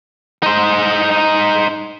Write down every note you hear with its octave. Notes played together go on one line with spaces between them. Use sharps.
D#4 C5